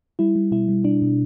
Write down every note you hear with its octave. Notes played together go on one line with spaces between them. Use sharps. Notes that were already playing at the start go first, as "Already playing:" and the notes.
G3 E4
G3
B2 E4
G3
B2 D4
B2